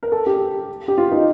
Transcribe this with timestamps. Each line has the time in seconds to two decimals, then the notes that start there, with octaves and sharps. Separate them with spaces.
0.03 A#4
0.12 A4
0.26 G4
0.88 G4
0.98 F4
1.11 D#4